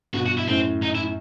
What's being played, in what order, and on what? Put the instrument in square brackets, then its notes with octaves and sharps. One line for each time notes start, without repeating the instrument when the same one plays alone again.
[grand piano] G2 B2 [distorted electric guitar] F#4
[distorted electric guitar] F#4
E4
[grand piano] F#2 A2 [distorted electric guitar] C4
[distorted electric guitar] D#4
E4